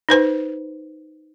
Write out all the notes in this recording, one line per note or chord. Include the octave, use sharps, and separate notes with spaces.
D#4 B4 C5